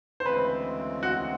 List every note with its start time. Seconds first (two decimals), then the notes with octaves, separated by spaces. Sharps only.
0.20 C5
0.25 D2 C#3 E3 G#3 C4 B4
1.03 F#4